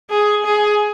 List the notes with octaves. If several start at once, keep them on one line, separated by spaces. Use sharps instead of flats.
G#4
G#4